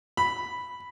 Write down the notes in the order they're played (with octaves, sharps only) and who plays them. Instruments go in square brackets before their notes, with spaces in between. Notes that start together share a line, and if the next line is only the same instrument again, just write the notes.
[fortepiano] B5